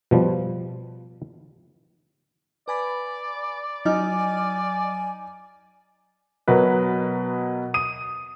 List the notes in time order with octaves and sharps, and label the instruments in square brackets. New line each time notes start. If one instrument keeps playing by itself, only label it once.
[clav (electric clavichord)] B2 F3 G3
[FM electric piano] B4 G#5 B5 [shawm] D5
[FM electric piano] F#3 D#5 F6 [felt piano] D#4 [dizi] G#5
[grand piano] B2 F#3 A#4 B4
D#6 D#7